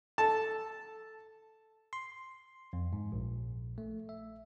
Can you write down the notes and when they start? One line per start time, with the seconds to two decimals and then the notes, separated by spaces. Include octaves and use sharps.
0.18 A4 A5
1.93 C6
2.73 F2
2.93 G#2
3.12 A#1
3.78 A3
4.09 E5